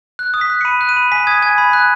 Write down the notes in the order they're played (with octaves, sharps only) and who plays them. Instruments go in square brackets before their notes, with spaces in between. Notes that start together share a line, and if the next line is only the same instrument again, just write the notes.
[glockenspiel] F#6
D#6
B6
F#6
C#7
B5 D#7
F#6
D#7
B5
G#5 B6
D#6 G#6
G#5 G#6
B5
F#6